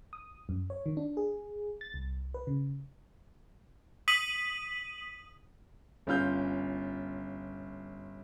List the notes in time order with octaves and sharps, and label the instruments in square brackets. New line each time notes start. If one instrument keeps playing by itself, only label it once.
[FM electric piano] D#6
F#2
C#5
D#3
D4
G#4
A6
C2
B4
C#3
[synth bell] D#6 B6 D#7 F#7
[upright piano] G1 C#4 F4 F6 G6